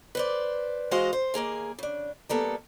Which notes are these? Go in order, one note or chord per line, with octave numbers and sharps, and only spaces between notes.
B4 C5 D5
E3 G#3 F#4 C5 D#5 F5
C5
D#2 A#3 G#4 F5
C#3 D4
G3 A#3 B3 A4